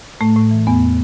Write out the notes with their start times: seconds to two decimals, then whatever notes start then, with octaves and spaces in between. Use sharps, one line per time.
0.21 A2 A3
0.36 A2
0.51 E3
0.67 E2 B3